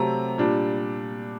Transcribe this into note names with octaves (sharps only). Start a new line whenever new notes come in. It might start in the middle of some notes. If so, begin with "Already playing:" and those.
Already playing: C3 F#3 A3 C4 A#5
A#2 G3 D4